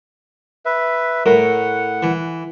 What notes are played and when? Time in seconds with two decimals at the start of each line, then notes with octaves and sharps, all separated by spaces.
0.65 B4 E5
1.26 A2 A#4 F#5
2.03 E3